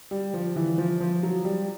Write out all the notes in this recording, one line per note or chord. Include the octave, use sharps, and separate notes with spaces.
G3
F3
E3
F3
F3
F#3
G3